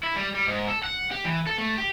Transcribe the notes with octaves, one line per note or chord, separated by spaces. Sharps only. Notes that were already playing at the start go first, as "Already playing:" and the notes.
E4
G3
G3
G#2
A4
F#5
G4
E3
A4
A3
G4